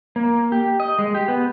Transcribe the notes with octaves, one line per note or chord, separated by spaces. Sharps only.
A#3
G4
D#5
G#3
G4
B3